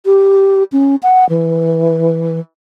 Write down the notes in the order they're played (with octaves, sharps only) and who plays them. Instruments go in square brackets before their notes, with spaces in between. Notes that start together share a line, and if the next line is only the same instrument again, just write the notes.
[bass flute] G4
C#4
F#5
E3